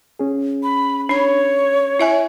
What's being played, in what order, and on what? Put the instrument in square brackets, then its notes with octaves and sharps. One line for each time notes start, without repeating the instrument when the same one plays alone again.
[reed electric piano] C#4 G#4
[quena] B5
[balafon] D4 B5 [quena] C#5
[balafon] E4 E5 G#5